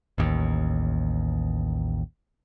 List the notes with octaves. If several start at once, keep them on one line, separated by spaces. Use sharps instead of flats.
A1 D#2